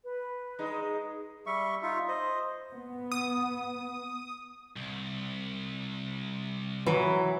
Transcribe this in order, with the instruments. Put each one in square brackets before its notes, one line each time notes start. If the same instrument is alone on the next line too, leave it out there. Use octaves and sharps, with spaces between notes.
[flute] B4
[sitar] G#3 D#4
[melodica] G3 E5 C#6
D#4 F4 E5
C5 D#5
[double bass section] B3
[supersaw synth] D#6
[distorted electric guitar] C2
[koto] E3 [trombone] F#3 [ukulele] B4